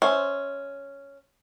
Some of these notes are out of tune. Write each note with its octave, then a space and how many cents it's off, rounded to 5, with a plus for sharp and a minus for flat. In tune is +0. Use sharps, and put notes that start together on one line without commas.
C#4 +0 C5 +0 E5 -25